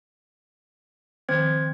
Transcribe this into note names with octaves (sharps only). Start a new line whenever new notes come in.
D#3 F3 C4 C5 G#6